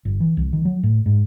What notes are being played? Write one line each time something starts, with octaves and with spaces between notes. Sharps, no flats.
G1
E3
C2
D#3
F#3
A2
G#2